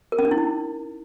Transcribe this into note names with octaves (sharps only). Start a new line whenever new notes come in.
A#4
C#4
D4
E4
D#4